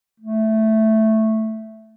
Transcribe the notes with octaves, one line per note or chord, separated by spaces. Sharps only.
A3